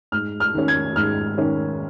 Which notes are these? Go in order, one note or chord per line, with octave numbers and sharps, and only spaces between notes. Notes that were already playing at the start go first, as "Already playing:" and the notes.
G#2 F6
F6
D#3 C#4
G#6
G#2 F6
D#3 C#4